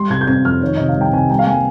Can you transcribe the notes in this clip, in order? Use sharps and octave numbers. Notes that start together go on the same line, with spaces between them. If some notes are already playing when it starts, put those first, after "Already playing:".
Already playing: G3 C6
C3 G#6
G6
C4 G#6
F2 F6
D#3 C#5
C3 D#5
F5
C2 G5
C3 G#5
G3 G5
F5
A#3 G#5